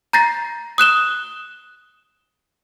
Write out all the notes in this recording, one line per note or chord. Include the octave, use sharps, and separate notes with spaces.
A#5 G6 A6 A#6 C7
D#6 F#6 E7 G7